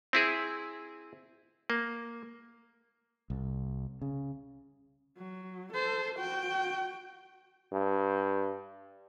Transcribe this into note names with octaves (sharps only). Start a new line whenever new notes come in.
C4 E4 G#4
A#3
C2
C#3
F#3
A4 C5
F#4 G5
G2